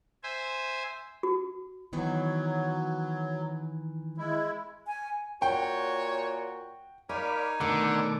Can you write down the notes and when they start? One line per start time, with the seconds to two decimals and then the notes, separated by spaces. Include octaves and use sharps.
0.23 C5 E5 G#5
1.23 F#4
1.93 D#3 E3 F#3 B3
4.18 G#3 E4
4.87 G#5
5.42 A#2 F#4 C#5 G5
7.09 D#4 A#4 C#5 D5 F5 G#5 B5
7.61 B2 D3 D#3 A3 D6